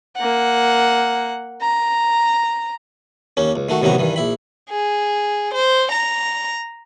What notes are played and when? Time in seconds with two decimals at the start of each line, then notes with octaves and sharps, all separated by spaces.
0.16 A#3 F#5
1.61 A#5
3.37 D#2 A#3 C#4
3.56 C#2
3.69 D#3 A3 F#4
3.82 A1 C3 D#3 F#3 B3 A#5
3.98 G2 D#3 E3
4.16 A#1 E4 B5
4.70 G#4
5.54 C5
5.92 A#5